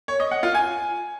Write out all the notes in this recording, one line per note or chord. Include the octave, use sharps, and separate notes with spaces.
C#5
D#5
F#5
F4
G#5